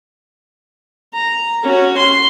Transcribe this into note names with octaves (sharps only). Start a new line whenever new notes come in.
A#5
C#4 F#4
C6